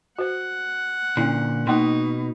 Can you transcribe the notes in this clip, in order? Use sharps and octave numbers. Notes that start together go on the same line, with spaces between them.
F#4 C5 F#5
A#2 D3 C#4 E4
B2 A#3 D#4 G5 C6